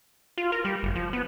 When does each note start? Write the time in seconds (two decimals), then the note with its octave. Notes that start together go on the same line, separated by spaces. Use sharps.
0.38 F4
0.52 A#4
0.65 G3
0.83 F#1
0.95 F3
1.13 B3